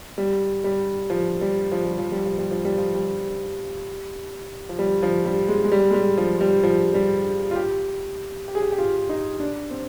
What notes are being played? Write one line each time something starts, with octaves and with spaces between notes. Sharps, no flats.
G3
G3
F3
G3
F3
G3
F3
G3
F3
G3
F3
G3
F3
G3
F3
G3
F3
G3
G#3
G#3
G3
G#3
G3
F3
G3
F3
G3
F4
G4
G4
G#4
G4
G4
F4
D#4
D4
C4